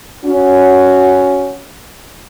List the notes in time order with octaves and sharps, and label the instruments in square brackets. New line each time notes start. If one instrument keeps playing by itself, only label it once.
[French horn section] C#4 F#4